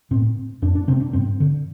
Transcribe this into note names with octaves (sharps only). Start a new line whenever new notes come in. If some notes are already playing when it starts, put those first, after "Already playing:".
A2 C4
F2 D4
D4
C3 C4
D4
G2 C4
D3